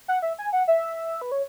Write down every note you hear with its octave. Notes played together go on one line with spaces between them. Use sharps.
F#5
E5
G#5
F#5
E5
B4
C#5